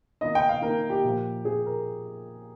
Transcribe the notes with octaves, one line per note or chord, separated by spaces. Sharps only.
D#3 A#3 D#4 D#5
G5
F5
D#3 A#3 D#4 A#4
G4
A#2 F3 A#3
A#2 F3 A#3 G#4
A#4